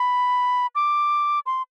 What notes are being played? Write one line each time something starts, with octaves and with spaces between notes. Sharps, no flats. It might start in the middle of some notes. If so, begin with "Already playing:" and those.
Already playing: B5
D6
C6